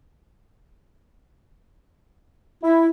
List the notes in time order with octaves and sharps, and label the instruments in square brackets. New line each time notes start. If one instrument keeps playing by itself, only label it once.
[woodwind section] E4